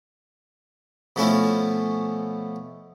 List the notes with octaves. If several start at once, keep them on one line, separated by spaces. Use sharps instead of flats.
B2 F3 A3 C#4 E4